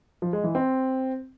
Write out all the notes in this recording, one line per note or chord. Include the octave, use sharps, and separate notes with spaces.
F3
G#3
E3
C4